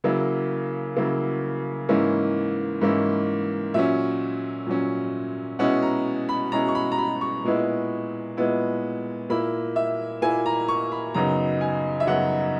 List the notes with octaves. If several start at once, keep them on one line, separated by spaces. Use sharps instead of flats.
C#3 F#3 A#3 E4
C#3 F#3 A#3 E4
G#2 E3 A#3 C#4 E4
G#2 E3 A#3 C#4 E4
A#2 F#3 C#4 E5
A#2 F#3 C#4
B2 G#3 C#4 E4 F#5
A#5
B5
B2 G#3 C#4 E4 A#5
C#6
B5
A#5
B5
C#6
A#2 G#3 B3 E4
A#2 G#3 B3 E4
A#2 A#3 E4 B5
E5
A#2 A#3 E4 G#5
A#5
C#6
B5
F#2 C#3 F#3 B3 D#4 A#5
G#5
E5
F#2 C#3 F#3 B3 D#4 F#5